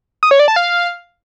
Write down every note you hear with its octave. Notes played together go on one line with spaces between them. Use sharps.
D#6
C#5
D5
A5
F5